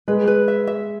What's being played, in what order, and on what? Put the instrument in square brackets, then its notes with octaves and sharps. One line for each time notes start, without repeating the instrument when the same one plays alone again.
[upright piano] G#3 [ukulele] B4
[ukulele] B4
E5
E5